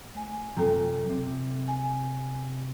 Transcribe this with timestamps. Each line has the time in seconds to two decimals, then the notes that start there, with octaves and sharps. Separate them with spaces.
0.15 A3 G#5
0.57 F#2 C3 F3 A4 G5 A#5
1.10 C3
1.68 G#5